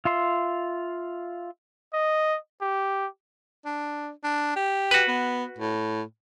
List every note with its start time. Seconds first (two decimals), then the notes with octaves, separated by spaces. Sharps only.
0.05 F4 E5 C6
1.94 D#5
2.62 G4
3.65 D4
4.24 D4
4.56 G4
4.91 F#4 B4
5.08 B3
5.59 A2